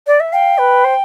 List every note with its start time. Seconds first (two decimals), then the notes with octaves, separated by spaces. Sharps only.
0.06 D5
0.20 E5
0.32 F5 G5
0.58 B4
0.84 C5